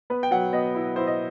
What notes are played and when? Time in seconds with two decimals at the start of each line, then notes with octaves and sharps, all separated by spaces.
0.10 B3 B4
0.23 G5
0.31 F#3 F#5
0.53 B3 D#5
0.75 E4
0.96 E4 C5
1.07 D#5